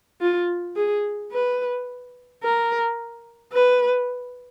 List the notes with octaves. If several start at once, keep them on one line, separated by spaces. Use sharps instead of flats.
F4
G#4
B4
A#4
B4